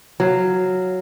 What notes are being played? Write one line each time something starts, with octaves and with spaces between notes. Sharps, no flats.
F#3 F5